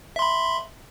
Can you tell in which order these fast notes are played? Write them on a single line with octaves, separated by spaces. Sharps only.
E5 C6 B5